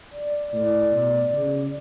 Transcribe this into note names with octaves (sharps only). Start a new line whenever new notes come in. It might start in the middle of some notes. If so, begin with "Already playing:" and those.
D5
A2
B2
C#3